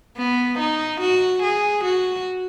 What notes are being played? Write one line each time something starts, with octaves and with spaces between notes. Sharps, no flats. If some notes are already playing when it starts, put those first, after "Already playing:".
B3
D#4
F#4
G#4
F#4